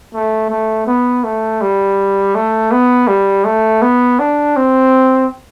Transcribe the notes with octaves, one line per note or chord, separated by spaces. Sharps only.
A3
A3
B3
A3
G3
A3
B3
G3
A3
B3
D4
C4